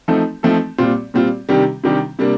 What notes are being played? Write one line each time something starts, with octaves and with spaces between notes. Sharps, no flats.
F3 A3 C4 D#4 A4
F3 A3 C4 D#4 A4
A#2 G3 C4 F4
A#2 G3 C4 F4
C3 D#3 G3 D4 G4
C3 D#3 G3 D4 G4
C3 G3 A#3 D4